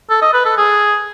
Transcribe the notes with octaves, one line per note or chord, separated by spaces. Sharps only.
A4
D#5
B4
A4
G#4